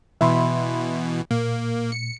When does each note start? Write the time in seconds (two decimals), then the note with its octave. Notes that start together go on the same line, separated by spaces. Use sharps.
0.21 B2 E3 E5 B5 C6
1.31 A#2 A#3
1.92 C#7